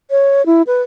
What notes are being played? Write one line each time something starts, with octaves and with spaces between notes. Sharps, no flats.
C#5
E4
B4